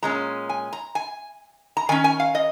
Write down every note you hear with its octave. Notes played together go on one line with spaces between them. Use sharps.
A#2 G#3 C#4 A#5
G#5
A#5
G#5
A#5
D#3 C#4 G#5
G#5
F5
D#5